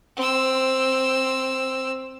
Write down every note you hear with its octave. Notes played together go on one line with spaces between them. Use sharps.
C4 E6